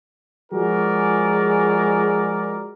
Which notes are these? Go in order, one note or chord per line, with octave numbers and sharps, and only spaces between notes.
F3 G#3 F#4 G#4 A#4 D5